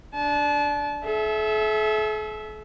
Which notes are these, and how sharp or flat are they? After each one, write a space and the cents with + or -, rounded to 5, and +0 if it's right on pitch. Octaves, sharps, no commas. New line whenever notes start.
D4 +0 A5 -30
A4 -45 E5 +0